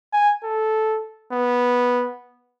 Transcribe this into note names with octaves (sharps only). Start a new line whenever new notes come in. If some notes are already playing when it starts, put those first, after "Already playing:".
G#5
A4
B3